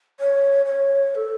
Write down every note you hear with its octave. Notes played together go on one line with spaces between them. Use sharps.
C#5
C#5
C#5
A4